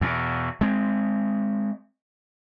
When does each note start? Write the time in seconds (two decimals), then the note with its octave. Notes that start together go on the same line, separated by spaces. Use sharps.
0.01 E2 B2
0.61 G#3 C4